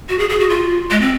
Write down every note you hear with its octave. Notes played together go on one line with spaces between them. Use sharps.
F#4
G#4
G#4
F#4
F4
G#3
C4